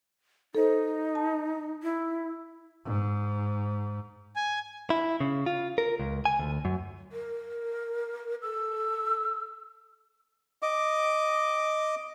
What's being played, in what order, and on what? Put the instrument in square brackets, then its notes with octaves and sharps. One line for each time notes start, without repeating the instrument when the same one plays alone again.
[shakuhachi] D#4 [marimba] A4 C5
[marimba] A5
[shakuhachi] E4
[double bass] G#2
[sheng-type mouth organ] G#5
[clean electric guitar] E4
C#3
F4
A#4
C#2
G#5
D2
F#2
[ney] A#4
[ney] A4 [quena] E6
[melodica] D#5 D6